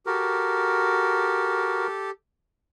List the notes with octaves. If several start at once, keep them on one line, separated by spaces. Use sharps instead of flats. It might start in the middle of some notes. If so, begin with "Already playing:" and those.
F#4 G4 A4 A#4